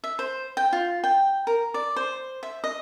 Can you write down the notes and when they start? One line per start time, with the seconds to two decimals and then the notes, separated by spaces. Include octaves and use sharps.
0.04 E5
0.19 C5
0.57 G5
0.73 F4
1.04 G5
1.47 A#4
1.74 D5
1.96 C5
2.43 E5
2.64 D#5